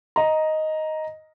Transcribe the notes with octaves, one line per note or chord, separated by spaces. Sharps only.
D#5 A#5